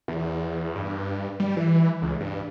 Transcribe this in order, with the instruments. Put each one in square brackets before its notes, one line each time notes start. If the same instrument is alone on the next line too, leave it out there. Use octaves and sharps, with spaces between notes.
[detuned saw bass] E2
G2
G3
E3
C#2
G2